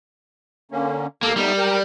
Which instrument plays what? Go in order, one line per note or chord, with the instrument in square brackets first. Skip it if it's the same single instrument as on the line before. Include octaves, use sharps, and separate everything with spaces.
[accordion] D3 A#3 C#4
[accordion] D#2 A4 D6 [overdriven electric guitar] A#3
[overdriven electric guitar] G3 [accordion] A3 B3 D#4
[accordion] A#4 G5